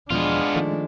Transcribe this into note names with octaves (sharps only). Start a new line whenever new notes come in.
E2 B2 F3 G#3 B3 D4 F4
D#3 F3 A3